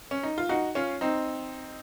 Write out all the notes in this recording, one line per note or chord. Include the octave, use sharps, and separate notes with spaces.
C#4
D#4
F4
D#4 F#4
C#4 F4
C4 D#4